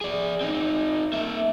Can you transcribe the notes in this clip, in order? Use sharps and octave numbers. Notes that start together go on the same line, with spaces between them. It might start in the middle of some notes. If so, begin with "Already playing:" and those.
G#4 D5
C4 D#4
A#3 E5